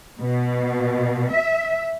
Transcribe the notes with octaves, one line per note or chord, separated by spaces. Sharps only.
B2
E5